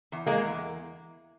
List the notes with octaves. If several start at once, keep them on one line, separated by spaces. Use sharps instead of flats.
E2
G#3 A#3
E2